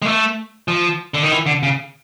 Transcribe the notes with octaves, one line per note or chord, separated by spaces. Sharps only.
G#3
A3
F3
D3
D#3
E3
D3
C#3